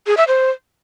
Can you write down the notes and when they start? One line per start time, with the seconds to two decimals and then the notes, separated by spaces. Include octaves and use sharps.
0.07 G#4
0.17 E5
0.28 C5